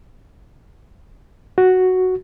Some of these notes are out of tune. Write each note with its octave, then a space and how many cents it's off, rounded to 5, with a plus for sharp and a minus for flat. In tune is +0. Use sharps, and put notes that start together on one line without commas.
F#4 +0